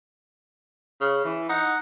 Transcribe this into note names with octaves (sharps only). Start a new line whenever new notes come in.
C#3
E3
D#4 F#5